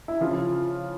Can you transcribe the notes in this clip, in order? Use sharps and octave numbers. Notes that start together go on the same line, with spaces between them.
E4
C#3 F3 F4